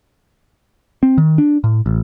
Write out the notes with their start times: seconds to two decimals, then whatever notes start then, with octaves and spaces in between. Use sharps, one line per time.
1.03 C4
1.18 D#3
1.38 D4
1.64 A2
1.86 A1